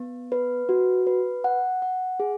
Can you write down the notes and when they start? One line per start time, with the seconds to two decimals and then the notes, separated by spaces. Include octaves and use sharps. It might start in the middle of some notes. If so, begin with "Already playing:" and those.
Already playing: B3
0.32 B4
0.69 F#4
1.07 B4
1.44 F#5
1.82 F#5
2.20 G#4